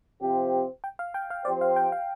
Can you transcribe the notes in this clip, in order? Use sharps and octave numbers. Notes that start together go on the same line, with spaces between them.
C3 F3 C4 G4
G5
F5
G5
F5
F3 C4 G4 C5 D5
F5
G5
F5